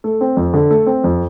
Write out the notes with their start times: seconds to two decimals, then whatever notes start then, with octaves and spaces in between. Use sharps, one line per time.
0.04 A3
0.21 C4
0.37 F2
0.54 D3
0.71 A3
0.86 C4
1.04 F2